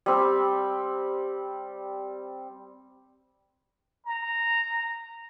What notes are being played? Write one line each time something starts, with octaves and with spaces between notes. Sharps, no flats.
G3 C4
A#5